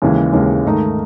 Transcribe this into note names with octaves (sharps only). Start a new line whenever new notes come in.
D#2 C#3 E3 G#3
D#2 C#3 E3 G#3
G#2 D#3 A3 D#4